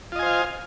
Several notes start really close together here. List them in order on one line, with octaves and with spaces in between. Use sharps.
F4 D#5 G#5 C5 F5